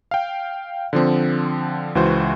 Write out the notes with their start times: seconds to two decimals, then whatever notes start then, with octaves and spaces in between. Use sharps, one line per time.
0.11 F5 G5
0.93 D3 F3 C4
1.95 C#2 E3 F#4 C5